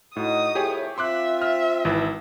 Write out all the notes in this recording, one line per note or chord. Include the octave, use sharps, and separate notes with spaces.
A2 D#4 F#4 D#5 D#6
C2 F2 A2 G4 G#4 C#5
C4 F4 E5 C6 D6 F#6
E5 F6
G#1 E3